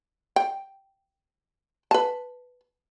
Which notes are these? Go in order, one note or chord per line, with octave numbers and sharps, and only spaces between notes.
G5
B4 A5